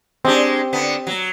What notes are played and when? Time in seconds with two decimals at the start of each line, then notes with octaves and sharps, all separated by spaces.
0.25 G#3 C4 D4 G4
0.73 D3 B3
1.07 F#3